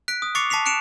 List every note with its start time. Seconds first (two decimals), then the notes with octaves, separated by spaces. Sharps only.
0.08 F#6 B6 D7
0.22 D#6
0.35 C#6 D6 A6 C7 C#7 F7
0.50 A5 D6 B6 C7 F7
0.66 F#6 C#7 D7 E7 F7